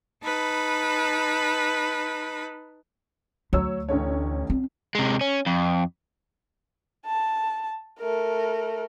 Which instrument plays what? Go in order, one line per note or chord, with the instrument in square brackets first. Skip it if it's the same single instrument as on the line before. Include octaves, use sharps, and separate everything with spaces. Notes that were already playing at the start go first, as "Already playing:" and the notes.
[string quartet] D#4 B4 A5 B5
[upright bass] D2 [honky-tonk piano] F#3 C#5 E6
[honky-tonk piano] A1 D3 C#5
[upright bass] C4
[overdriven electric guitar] C3 G#3
C#4
F2
[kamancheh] A5
A3 A#4